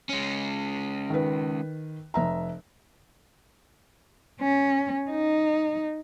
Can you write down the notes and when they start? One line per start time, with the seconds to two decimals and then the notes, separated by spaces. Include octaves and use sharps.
0.09 G#3 C#4
1.10 D#3 B4
2.14 F1 E5 A#5
4.40 C#4
5.11 D#4